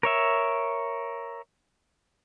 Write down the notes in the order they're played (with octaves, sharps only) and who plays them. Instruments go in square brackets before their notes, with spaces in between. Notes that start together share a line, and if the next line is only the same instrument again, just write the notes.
[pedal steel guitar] A#4 C#5 E5